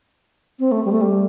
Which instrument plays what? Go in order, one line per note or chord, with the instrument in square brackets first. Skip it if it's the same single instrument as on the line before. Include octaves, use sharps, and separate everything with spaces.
[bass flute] C4
A3
G3
A3
G3